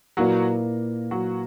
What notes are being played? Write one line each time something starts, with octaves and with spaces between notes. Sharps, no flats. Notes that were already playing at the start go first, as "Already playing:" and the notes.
A#2 F#3 A#3 E4 F#4 B4 D5
F#3 F#4